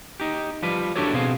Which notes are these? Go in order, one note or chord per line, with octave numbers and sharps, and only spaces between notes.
D#4 G4
F3 G3 B4
D4 E4 F#4 G4 A4 C#5
B2 C4 G#4 F5